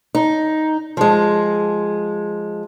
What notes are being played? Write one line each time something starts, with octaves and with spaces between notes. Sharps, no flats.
D#4
F3 G#3